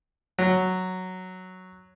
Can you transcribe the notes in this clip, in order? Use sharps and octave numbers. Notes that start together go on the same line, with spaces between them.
F#3